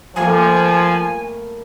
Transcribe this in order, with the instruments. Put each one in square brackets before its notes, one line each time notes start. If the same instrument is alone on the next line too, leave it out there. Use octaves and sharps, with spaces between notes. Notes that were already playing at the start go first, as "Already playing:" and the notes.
[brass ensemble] F3 [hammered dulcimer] G3 A3 A#3 [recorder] G#5